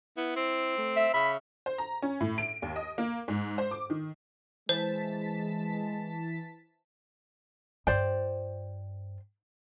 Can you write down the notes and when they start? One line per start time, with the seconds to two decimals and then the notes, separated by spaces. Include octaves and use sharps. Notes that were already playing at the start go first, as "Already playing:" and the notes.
0.17 B3 E4
0.36 C4
0.78 A3
0.97 E5
1.14 C#3 E5 B5
1.66 C5
1.78 A#5
2.02 C#4
2.21 A2
2.38 D7
2.62 D#2
2.76 D#5
2.98 A#3
3.28 G#2
3.58 C5
3.71 D6
3.90 D#3
4.69 E3 G#3 C5 A5 B6
7.87 G2 F4 C5 D5 G5